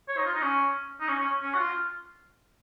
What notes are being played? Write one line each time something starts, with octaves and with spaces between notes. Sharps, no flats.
C#5
D#4
F4
D#4
C#4
D#4
C#4
C#4
C#4
F#4
F4